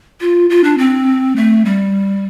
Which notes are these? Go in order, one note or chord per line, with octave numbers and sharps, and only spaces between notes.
F4
F4
D4
C4
A3
G3